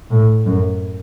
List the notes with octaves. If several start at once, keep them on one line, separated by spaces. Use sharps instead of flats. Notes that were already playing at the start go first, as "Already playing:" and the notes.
A2
F#2